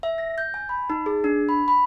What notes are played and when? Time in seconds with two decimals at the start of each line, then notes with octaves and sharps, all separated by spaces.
0.03 E5
0.18 A#6
0.38 G6
0.54 G#5
0.69 B5
0.90 D#4
1.06 G#4
1.24 D4
1.49 B5
1.68 B5